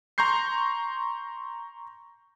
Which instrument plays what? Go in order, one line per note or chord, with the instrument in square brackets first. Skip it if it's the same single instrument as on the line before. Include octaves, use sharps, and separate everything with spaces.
[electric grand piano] A#5 C6 C#6 G6 C7